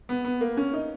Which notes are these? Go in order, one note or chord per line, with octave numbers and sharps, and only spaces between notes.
B3
B3
A#3
C#4
D#4